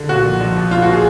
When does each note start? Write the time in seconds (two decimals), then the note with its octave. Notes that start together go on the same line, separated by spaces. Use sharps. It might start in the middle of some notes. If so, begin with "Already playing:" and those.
Already playing: D3
0.09 A#2 F#4
0.25 A#1
0.41 A#1
0.56 F3
0.71 A#2 F4
0.82 F#4
0.93 G#4